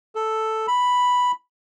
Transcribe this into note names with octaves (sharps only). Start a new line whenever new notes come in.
A4
B5